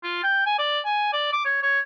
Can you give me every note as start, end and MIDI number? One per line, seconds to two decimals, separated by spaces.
0.03 0.19 65
0.23 0.42 79
0.46 0.55 80
0.59 0.80 74
0.85 1.11 80
1.13 1.31 74
1.33 1.45 86
1.45 1.61 73
1.62 1.80 73